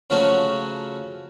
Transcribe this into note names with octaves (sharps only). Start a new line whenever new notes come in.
C#3 F3 F#3 A3 C#4 F#4